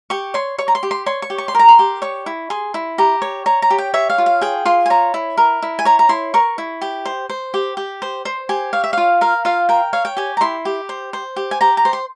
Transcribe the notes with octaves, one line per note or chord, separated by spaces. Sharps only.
G4 C#6
C#5 C6
C#5 C#6
A#5
C6
G4
C6
C#5 C6
C#6
G4
C#6
C6
A#4 A#5
C6
G4
C#5 C#6
E4
G#4 C6
E4
G4 A#5
C#5
C#5 A#5
A#5
G4
G5
C#5 E5
F5
F4
F5
G#4 G5
F4 C6
G#5
C#5 A#5
E4
A#4
E4
G#5
C#5 A#5
A#5
E4 C6
A#4 C#6
E4
G4
C5
C5
G4
G4
C5
C5 C6
G4 G#5
C#5 F5
E5
F4 F5
A#4 F5
F4 F5
A#4 G5
C#5 F5
G5
G4 G#5
A#5
E4 C6
G4
C5
C5
G4
G#5
G4 A#5
A#5
C5
C6